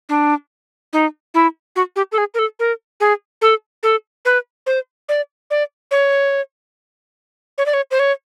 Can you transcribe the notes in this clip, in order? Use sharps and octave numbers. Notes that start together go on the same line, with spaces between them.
D4
D#4
E4
F#4
G4
A4
G#4
A#4
A4
A#4
G#4
A4
A4
B4
C5
D5
D5
C#5
C#5
D5
C#5
C5
C#5